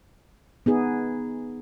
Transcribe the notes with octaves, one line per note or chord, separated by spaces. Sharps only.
B3 D#4 G#4